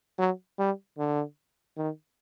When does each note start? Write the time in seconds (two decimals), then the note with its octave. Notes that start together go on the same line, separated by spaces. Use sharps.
0.19 F#3
0.59 G3
0.98 D3
1.77 D#3